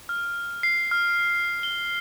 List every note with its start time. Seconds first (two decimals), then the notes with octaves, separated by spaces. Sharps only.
0.09 F6
0.63 C7
0.91 F6
1.63 G7